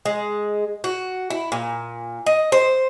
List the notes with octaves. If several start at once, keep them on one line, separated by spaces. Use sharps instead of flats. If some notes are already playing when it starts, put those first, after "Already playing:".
G#3
F#4
E4
A#2
D#5
C5